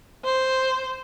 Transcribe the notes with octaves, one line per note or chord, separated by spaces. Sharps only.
C5